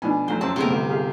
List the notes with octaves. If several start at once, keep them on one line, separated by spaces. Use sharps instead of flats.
B2 F3 D4 G#5
F2 F#3 C5
F#2 C4 A5
C3 G#3 A3 B3 A#4
G1 C5
G4 G#4 F5